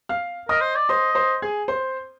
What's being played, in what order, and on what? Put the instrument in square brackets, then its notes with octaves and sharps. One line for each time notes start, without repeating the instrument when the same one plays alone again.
[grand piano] F5 F6
[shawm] A#4 [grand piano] D#5 D#6
[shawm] C5
D5
[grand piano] C5 C6 [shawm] D#5
[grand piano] C5 C6
G#4 G#5
C5 C6